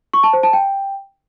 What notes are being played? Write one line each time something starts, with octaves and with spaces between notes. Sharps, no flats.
C#6
A5
C5
A5
G5